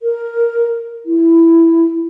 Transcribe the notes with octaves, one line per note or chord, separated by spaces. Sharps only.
A#4
E4